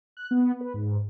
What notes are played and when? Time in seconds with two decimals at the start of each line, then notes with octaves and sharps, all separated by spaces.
0.17 F#6
0.31 B3
0.61 B4
0.74 G#2